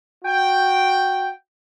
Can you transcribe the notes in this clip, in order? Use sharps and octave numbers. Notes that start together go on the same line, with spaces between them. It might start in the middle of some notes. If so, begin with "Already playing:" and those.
F#4 G5